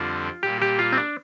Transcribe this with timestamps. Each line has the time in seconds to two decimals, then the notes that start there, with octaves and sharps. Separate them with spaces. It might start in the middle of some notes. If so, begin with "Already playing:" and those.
Already playing: F2 D3 G3 C4 F4
0.43 A#2 G3 A#3 G4
0.62 G4
0.79 F4
0.93 C4
0.98 D4